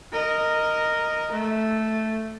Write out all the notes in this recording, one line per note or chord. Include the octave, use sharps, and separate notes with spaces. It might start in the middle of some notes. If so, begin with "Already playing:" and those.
A#4 D#5
A3